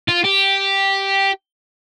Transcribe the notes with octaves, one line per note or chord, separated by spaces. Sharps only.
F4
G4